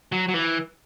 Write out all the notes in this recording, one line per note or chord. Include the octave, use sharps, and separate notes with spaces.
F#3
F#3
E3